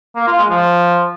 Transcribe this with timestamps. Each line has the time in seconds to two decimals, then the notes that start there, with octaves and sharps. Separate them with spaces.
0.16 A#3
0.27 F4
0.38 G#3
0.50 F3